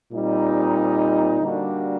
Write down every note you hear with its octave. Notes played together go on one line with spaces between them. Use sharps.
A#2 G3 C4 D#4
D3 G3 A#3 D4 F#4